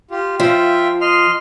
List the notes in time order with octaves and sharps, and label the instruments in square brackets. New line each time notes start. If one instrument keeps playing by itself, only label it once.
[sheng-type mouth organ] F4 G4
[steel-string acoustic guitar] F3 [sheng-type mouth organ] F4 E5 G5
[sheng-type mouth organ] D#5 C6 F6